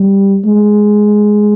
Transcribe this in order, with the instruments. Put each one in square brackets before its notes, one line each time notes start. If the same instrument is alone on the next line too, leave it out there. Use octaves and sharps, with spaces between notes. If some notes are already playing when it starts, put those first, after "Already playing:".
Already playing: [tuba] G3
G#3